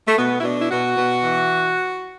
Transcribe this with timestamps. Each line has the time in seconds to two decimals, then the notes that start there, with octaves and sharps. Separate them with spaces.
0.06 A3
0.16 B2 B3
0.40 E4
0.43 B2 D4
0.60 E4
0.70 B2 F#4
0.96 B2
1.23 E3